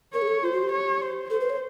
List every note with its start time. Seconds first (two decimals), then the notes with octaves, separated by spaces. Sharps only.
0.14 A#4 C#5
0.22 G#4
0.27 A4
0.42 F4 C5
0.53 F#4
0.63 G4
0.72 C#5
1.01 C5
1.30 A4 C5
1.41 B4
1.50 C#5